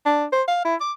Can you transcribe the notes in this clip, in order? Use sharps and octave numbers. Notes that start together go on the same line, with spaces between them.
D4
C5
F5
E4
D6